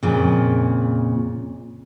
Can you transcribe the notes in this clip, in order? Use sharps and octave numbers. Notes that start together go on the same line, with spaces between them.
F2 A#2 C#3